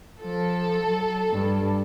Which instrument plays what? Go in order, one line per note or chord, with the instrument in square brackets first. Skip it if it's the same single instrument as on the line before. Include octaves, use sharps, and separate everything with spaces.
[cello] F3 [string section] A4
[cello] F#3
G2 D4